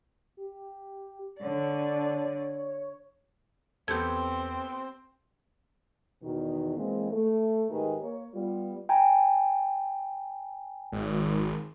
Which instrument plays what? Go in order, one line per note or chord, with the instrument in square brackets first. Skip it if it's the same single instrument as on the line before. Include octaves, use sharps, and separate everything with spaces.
[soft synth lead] G4
[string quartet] D3 D5 [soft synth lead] C#5
[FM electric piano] E2 [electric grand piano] B3 G4 A4 [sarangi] C4 [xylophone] G6 G#6
[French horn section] E2 B2 D#3
E3 G#3 A#3 C4
A3
G#2 D#3 G4 G#4 B4 D#5
A#3 C#5
G3 B3 F4
[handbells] G5 G#5 A#5
[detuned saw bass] G#1